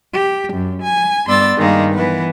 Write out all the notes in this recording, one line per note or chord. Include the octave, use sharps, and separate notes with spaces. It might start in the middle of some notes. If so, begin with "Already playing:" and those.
G4
F#2
G#5
G2 B3 D5 C6 E6 A6
G2 D#3 G#3 A#3
E3 B3